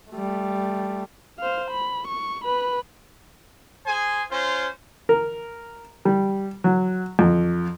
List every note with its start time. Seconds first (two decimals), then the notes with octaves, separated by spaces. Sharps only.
0.11 G3 A3
1.39 C5 F5
1.71 B5
2.07 C#6
2.44 B4 B5
3.86 G#4 C5 G#5
4.31 C#4 F4 C5
5.09 A#4
6.05 G3
6.64 F#3
7.19 F2